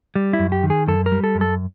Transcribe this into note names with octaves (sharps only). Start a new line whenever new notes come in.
G3
E4
F#2
G4
D#3
G#4
F#2 A4
A#4
G3
A4
F#2
A4